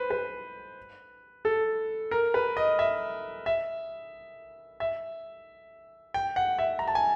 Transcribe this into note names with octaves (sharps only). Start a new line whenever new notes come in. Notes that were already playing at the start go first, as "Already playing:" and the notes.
Already playing: B4 C5
B4
A4
A#4
B4
D#5
E5
E5
E5
G5
F#5
E5
A#5
A5
G#5